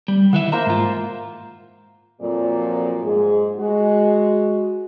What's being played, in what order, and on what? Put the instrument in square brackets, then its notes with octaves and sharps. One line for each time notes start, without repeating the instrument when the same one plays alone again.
[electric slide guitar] G3
[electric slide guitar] D#3 E3 E5 [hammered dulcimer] F#5
[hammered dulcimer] A#3 A#4 C5 [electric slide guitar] E5
[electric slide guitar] G#2 F4
[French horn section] F2 A#2 F3 F#3 D5
G#2 G#3 G#4
G#3 F#4